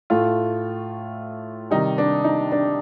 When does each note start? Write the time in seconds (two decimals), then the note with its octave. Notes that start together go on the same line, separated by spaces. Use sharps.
0.10 A2 A3 F4
1.71 C3 D#3 G3 D#4
1.98 D4
2.24 D#4
2.52 D4